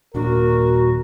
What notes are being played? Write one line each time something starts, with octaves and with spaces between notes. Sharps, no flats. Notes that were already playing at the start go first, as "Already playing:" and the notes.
D#1 A#2 D4 F#4 A#4